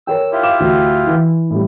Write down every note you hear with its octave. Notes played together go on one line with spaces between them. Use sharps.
A#4 C#5 G5 E6
E4 F4 G4
F5 D6 E7
D2
E3
A2 G3